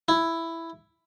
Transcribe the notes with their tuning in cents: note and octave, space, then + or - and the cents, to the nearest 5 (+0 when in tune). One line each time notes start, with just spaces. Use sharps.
E4 +5